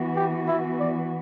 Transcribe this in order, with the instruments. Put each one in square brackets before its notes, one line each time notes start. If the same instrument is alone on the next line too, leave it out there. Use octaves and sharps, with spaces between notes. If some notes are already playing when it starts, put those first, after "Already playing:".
Already playing: [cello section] E3 B3 F#4
[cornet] G4
E4
D5